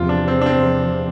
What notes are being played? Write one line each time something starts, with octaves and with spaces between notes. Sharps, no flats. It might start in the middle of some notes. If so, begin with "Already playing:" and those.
Already playing: E2 C3 F3 F4
D4
C4
D4
C4